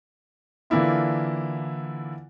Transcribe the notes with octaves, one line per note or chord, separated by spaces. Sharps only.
D3 E3 A#3 D4 E4 F4